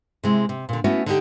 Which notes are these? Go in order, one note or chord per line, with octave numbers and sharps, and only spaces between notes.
C3 G#3 E4
C3
A#2 D3
A3 B3 C#4 E4 F#4
D3 D#4 G4